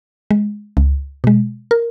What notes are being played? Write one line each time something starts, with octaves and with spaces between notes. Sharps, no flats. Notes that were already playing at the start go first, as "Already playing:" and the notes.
G#3
C#2
B2 G#3
A#4